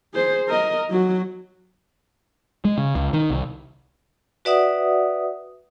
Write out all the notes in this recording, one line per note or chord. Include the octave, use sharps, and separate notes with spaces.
G#4 C5
A#4 D#5
F#3 F#4
G#3
C#3
C#2
D#3
C2
F#4 B4 D5 E5 F#5 D#6